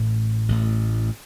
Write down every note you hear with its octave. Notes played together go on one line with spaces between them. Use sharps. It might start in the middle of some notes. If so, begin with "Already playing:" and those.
Already playing: A1 A2
A1 A2